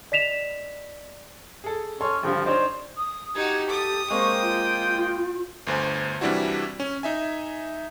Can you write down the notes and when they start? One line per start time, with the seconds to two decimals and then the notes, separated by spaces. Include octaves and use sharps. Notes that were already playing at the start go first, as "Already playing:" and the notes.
0.12 D5 D#5 B6 E7 F7
1.64 G#4 A4
2.01 C#4 A4 C#5 C6
2.23 G#1 D3 F3 G3
2.46 D4 D#4 C5 C#5
2.97 D#6
3.35 D#4 F#4 G4 G#6
3.69 A4 D#6
4.10 G#3 A#3 C4 G5 C#6
4.42 F4
5.67 G1 D2 C5 G#5
6.21 C3 E3 G3 D4 E4 F#4
6.80 C#4
7.03 D#4 E5 G#5